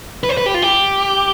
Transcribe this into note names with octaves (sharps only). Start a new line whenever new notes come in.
B4
C5
B4
G4
F4
G4